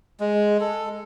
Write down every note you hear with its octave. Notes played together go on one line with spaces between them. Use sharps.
G#3
A4